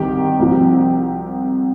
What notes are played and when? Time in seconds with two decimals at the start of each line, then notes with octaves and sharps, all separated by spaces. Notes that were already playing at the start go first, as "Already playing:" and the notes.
Already playing: C2 C3 D#3 G4 G5
0.39 C2 C3 F3